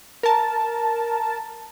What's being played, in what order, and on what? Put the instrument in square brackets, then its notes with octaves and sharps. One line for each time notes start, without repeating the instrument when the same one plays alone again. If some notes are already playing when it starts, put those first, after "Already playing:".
[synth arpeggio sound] A#4 A5